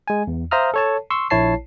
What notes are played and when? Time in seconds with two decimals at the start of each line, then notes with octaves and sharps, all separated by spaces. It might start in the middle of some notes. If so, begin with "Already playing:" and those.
0.08 G#3 G#5
0.27 E2
0.51 C5 E5 F5 A#5 D#6 F6
0.74 A4 C#5 A5
1.10 C6 C#6 E6
1.30 A#1 E4 C#5 A5 C7